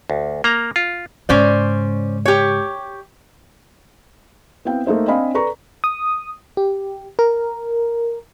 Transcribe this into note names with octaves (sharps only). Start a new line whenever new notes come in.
D2
A#3 A#5
F4
G#2 C#3 C#4 C5 D5
G4 C#5
B3 C4 E4 F5 G5
A3 A#3 D#4 C5 E5
C4 D4 D#5 F5 G#5 B5
A4 B4 D5 A#5 C#6
D#6
G4
A#4